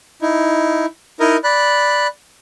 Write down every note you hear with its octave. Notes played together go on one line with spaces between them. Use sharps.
D#4 E4
D#4 E4 A#4 D#5
D5 B5 F#6